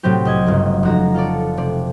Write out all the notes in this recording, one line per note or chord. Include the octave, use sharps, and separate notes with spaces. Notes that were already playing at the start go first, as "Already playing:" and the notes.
A2 C3 F#3 C4 G4
C2 D#5 G#6
G1 C#3 F#3
F1 F#4 A#5
F4 A4 C#5 D5
C3 D5